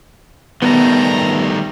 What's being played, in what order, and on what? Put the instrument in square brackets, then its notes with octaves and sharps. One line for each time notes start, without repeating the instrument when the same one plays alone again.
[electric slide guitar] D#3 G3 A3 [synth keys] B3 [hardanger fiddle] A#5